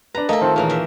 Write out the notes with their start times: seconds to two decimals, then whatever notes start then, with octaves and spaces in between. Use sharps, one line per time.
0.15 D4 B4 A#5
0.29 A3 A#3 A4 D#5 A#5
0.41 D#3 C4 F4
0.56 A#2 C#3 E3 A#3
0.70 E2 E5